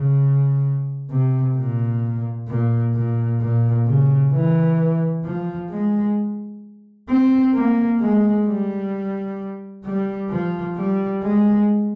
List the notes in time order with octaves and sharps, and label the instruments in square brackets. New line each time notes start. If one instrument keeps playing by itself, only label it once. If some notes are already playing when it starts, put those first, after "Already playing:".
Already playing: [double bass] C#3
C3
A#2
A#2
A#2
A#2
C#3
E3
F3
G#3
C4
A#3
G#3
G3
G3
F3
G3
G#3